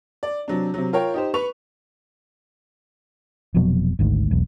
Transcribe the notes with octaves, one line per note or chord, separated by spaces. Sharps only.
D5
C3 F#3 D4
C3 F#3
F4 A#4 C#5 G5
D#4 G4 C5
B4 C#6 F7
F1 F2 B2 F#3
G#1 D2 G#2
E1 B1